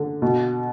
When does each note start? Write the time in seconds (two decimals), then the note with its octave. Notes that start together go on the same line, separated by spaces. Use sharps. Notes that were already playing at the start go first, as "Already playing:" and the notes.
Already playing: D3
0.22 B2